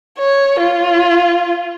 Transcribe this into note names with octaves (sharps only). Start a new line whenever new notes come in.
C#5
F4